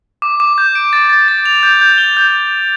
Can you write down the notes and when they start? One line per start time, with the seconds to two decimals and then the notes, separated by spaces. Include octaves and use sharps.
0.22 D6
0.40 D6
0.58 G6
0.75 D7
0.93 A6
1.10 A6
1.28 A6
1.46 F7
1.63 G6
1.81 G6
1.98 G7
2.17 G6